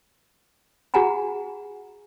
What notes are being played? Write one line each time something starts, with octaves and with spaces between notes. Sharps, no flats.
F#4 G#4 F#5 G#5 A#5 B5